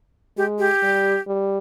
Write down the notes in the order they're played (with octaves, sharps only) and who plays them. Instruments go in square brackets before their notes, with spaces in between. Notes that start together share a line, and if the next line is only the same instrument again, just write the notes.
[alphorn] G#3 [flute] G4
[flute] G4
[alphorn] G3
G3